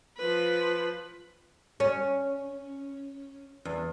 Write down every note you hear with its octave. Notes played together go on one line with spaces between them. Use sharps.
F3 B4
C#4
E2